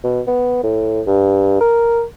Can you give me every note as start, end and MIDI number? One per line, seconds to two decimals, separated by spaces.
0.04 0.21 47
0.27 0.63 59
0.64 1.01 45
1.07 1.59 43
1.60 2.03 70